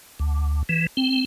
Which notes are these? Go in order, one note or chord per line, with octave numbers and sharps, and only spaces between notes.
D2
E3
C4